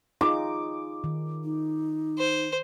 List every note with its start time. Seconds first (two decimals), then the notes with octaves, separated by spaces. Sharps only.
0.21 D#4 F4 G#4 D6
1.04 D#3
1.44 D#4
2.18 C5